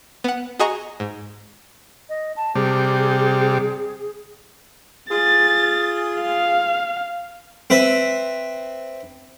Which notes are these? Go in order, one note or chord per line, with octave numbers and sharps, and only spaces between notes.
B3 F#5
F#4 G#4 D#5 G#5 A#5 C#6
G#2
D#5
A5
C3 G3 G#4
F4 G#4 A6
F5
C4 B4 E5